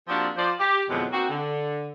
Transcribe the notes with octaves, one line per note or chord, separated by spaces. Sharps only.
F3 A#3 C4 D4 F#4 G4
F3 C5 D5
G4
F2 B2 D3 E3 F#3 G#3
A#3 C4 D#4 F#4
D3